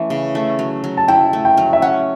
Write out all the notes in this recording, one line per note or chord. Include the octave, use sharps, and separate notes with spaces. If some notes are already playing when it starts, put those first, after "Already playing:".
Already playing: E3 A3 C#4
C#3
A3
F#3
F#3
A5
E4 G5
A3
G5
F#3
E5
C#4 F#5